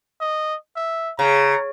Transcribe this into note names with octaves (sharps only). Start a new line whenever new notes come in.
D#5
E5
C#3 A#5